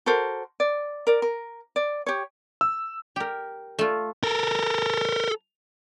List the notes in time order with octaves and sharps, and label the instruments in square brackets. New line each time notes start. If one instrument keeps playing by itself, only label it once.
[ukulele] F#4 A4 A#4 C5
D5
A#4 D5
A#4
D5
G4 C#5
[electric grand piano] E6
[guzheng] G4 A#4
A3 F4
[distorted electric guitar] A4 A#4